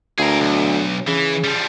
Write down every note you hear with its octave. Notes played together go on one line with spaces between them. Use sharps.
D2 G#4 A#4
B1
C#3 E3
F3 G3